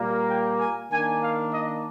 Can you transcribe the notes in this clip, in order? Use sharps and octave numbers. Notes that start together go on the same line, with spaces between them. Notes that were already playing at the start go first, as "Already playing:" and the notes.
Already playing: A#2 G3 A#3
G5
G#5
D#3 A#3 D4 G#5
F5
D#5